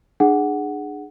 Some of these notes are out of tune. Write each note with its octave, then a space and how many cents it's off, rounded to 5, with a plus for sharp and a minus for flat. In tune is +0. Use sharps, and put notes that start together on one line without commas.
D4 +30 G#4 +0 F#5 +0